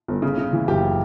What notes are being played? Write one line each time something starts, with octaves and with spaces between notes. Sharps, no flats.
G1
C#3
C#3
E3
F#1 G4